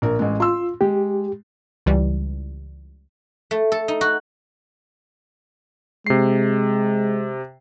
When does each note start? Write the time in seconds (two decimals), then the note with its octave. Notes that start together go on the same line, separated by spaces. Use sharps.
0.02 A#1 A#4
0.19 A1 G#3
0.40 F4 C6 E6
0.81 G#3 G4
1.86 C#2 E3 G3
3.51 A3
3.72 A4
3.88 D#4
4.01 F#4
6.07 C3 G#3 C7